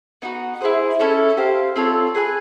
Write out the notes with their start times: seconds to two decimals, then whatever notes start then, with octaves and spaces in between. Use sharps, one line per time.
0.22 B3 D#4 F#4
0.61 E4 G#4 C5 D#5
0.99 C#4 E4 A4 C#5
1.37 G4 C5 F5
1.76 C4 F4 A4 C#5
2.15 G#4 B4 E5 G#5